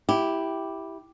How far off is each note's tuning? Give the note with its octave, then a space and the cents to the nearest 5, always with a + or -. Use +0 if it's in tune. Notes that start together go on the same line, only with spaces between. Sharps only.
E4 -5 G4 +0